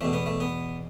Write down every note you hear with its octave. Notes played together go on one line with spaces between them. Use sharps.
E2 B2 A3
B3
A3
B3